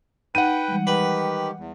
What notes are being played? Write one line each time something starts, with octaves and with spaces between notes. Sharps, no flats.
D#4 B4 F#5 G5 D#7
E3 G3 G#3
D#3 G4 B4
E2